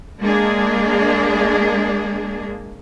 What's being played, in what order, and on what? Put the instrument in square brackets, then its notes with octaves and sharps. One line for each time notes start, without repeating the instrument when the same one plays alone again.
[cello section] G#3 A#3 D4 G#4